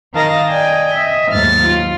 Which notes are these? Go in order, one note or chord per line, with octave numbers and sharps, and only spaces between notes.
D#3 A#4 D#5 F5 A5 A#6
D5 D#5 G5 G#5
D#5 E5
D#2 G#2 F#3 A3 F6 A6
F4